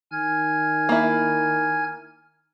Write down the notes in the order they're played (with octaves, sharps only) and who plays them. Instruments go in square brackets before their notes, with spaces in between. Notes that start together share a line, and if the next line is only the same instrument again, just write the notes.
[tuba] D#3 [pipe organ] G#5 F6 G#6
[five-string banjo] A#3 E4